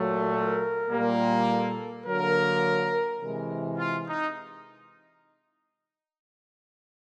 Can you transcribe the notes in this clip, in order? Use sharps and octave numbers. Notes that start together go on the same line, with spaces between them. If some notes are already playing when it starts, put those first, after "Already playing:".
Already playing: A#2 F#3 A3
A#4
A#2 G3 A#3
A4
D3 F#3 A#3 A#4
C3 E3 G#3
F4
D#4